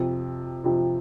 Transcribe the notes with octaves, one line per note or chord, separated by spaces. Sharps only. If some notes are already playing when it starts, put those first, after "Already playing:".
Already playing: F2 C3 F3
F2 C3 F3